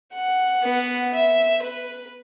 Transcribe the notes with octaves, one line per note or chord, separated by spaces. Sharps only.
F#5
B3
E5
B4